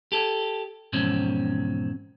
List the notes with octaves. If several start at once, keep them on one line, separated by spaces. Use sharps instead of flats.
G4 A4
E2 G#2 B2 F3 C4 C#4